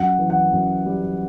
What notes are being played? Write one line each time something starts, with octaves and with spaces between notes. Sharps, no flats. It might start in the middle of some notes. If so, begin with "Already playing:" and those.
Already playing: F#2 F#5
E3
F#5
F#2
G3